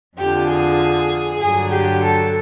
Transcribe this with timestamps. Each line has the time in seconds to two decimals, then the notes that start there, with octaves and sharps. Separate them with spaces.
0.18 F2 D3 F3 G4
0.49 G#4
1.41 G2 D3 F#3 G#4
1.72 G4
2.03 A4